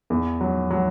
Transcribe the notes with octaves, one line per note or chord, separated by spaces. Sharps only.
E2
F#3
F#3